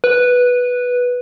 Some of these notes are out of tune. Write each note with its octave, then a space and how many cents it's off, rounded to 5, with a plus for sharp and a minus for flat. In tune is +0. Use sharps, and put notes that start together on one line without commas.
B4 -5